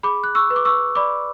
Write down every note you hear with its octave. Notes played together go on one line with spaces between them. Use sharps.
G#4 B5 D6
F#6
C#6 E6
B4
D6
C#6 E6
D5 B5 D6